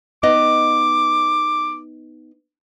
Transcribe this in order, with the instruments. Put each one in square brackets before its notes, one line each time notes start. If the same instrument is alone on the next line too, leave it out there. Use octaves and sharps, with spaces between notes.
[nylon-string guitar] B3 D#4 D#5 [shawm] D6